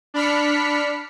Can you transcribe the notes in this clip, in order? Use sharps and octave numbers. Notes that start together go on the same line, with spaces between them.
D4 B5 F6 B6 C#7